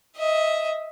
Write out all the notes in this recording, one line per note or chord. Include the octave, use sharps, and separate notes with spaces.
D#5 E5